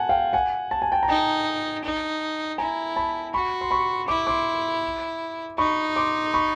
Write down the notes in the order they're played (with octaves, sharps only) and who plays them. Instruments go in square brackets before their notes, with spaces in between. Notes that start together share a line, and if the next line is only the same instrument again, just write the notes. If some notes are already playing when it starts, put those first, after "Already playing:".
Already playing: [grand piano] F#5 G#5 A5
F5 G5
F#5 G#5
A5
G#5
G5 A5
A#5
[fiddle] D#4 [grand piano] G5 A5
[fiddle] D#4
[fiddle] E4 [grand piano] G#5 A#5
[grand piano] A5 B5
[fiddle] F#4 [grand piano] B5 C#6
[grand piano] C6
B5 C#6
[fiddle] E4 [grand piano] D6
[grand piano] C6 D6
[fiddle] D#4 [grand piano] B5 C#6
[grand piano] C6 D6
B5 C#6